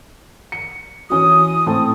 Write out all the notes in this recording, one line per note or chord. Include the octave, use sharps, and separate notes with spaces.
C#7
E3 C#4 F#4 D#6
A2 C4 A5